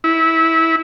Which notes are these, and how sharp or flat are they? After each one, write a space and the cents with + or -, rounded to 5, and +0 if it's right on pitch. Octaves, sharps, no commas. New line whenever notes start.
E4 -20